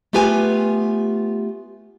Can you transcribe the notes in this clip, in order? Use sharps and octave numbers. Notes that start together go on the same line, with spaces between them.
A3 B3 F4 G4 B4 G#5